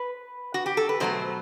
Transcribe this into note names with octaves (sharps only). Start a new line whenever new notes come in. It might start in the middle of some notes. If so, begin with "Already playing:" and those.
Already playing: B4
F#4
G4
A4
B4
B2 F#3 A3 C5